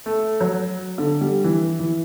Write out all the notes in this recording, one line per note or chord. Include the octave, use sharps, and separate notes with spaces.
A3
F#3
D3
G3
E3
E3